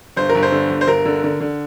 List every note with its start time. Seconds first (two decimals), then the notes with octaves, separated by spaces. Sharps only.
0.16 G1 C5
0.29 A#4
0.35 G1
0.43 C5
0.52 D3
0.70 G1
0.81 C5
0.87 G1 A#4
1.05 D3
1.24 D3
1.41 D3